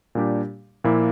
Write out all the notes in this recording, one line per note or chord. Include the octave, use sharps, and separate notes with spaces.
A#2 G3 D4 G4
A#2 F3 A#3 E4